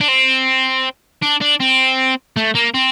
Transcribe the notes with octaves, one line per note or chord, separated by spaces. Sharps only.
D4
C4
D4
D4
C4
A3
A#3
C4